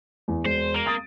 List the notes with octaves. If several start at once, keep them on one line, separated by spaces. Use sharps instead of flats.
E2
E1 C5
A#3
D#6 A6 D7